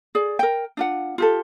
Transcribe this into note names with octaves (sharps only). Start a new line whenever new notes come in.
G#4 D5
A#4 G5
D4 F4 F#5
F4 G4 A4